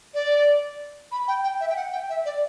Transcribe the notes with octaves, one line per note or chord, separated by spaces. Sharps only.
D5
B5
G5
G5
E5
G5
F#5
G5
E5
D5